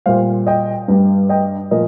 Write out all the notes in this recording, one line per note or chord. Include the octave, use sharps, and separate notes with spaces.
A#2 G3 C5 F5
D#5 G5
G2 G3
D#5 G5
A#2 F3 A#4 D#5